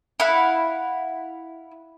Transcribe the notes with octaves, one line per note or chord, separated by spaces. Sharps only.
E4 F5 F#5